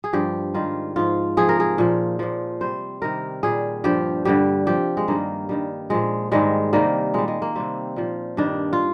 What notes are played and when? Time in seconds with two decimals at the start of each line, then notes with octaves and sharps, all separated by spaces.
0.04 G#4
0.13 G2 F3 G4
0.54 G#2 D#3 G3 F4
0.96 G#2 F3 F4
1.37 C3 F3 G#4
1.49 A#4
1.60 G#4
1.78 A#2 F3
2.19 A#2 F3
2.61 C3 G3 C5
3.02 C3 D#3 G3 A#4
3.43 A#2 G3 G#4
3.84 G2 F3 G4
4.25 G2 D3 G3 G4
4.67 C3 F3 G4
4.97 G#3
5.08 G2 D#3 G3 A#3
5.49 G2 D#3 G3
5.90 A#2 F3 G#3
6.32 G#2 D#3 G3 G#3
6.73 C3 D#3 G3 A#3
7.14 A#2 G3 G#3
7.28 G#3
7.42 A#3
7.55 C3 G3 C4
7.96 A#2 F3
8.37 G2 D#3 G3 D4
8.73 F4